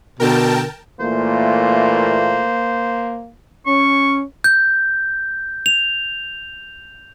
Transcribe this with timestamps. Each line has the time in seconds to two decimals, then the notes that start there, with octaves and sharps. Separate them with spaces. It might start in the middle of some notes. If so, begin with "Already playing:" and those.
0.20 B2 D3 A#4 G5 A5
1.00 A#2 E3 A3 A#3 C5
3.66 C#4 C#6
4.44 G6
5.66 F7